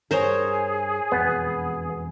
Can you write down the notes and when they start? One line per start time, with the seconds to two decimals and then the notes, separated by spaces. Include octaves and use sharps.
0.11 G2 G#4 A#4 C5 C#5
1.12 E1 F2 B2 B3